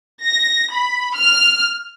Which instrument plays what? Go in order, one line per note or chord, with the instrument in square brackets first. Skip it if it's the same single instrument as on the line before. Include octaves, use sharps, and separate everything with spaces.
[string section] A#6
B5
F6